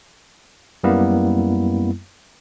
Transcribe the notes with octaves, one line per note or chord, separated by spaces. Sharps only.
F#2 G3 A#3 B3 E4